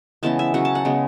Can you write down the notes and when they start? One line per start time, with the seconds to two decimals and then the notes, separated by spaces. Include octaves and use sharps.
0.23 C#3 E3 G#3 B3 A5
0.39 E5
0.54 C#3 F#3 C#4 F#5
0.65 A5
0.75 F#5
0.85 C#3 G#3 B3